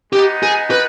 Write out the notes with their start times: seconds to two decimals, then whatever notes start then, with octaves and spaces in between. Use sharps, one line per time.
0.13 G#3 B3 D#4 G4
0.43 G#4
0.71 B4